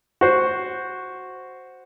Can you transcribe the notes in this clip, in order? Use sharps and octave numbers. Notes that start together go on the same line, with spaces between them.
F#4 C5